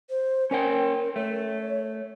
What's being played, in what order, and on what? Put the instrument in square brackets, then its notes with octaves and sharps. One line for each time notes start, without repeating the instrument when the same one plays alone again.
[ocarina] C5
[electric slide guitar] C#4 C#5 G5 [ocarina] A#4
[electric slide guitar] A3 [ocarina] C#5